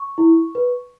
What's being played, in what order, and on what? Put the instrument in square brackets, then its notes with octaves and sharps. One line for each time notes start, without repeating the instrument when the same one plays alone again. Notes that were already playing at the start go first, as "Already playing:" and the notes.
Already playing: [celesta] C#6
E4
B4